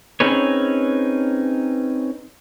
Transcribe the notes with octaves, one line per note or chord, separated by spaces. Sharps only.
C4 C#4 D#4 G#4 B4 C#5